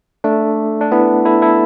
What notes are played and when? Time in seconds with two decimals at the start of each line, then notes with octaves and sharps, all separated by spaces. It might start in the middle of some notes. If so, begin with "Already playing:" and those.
0.24 A3 D4
0.81 D4
0.92 B3 E4
1.26 E4 A4
1.42 E4 A4